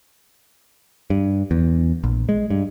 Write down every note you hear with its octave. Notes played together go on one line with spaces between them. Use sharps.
G2
E2
A#1
G#3
G2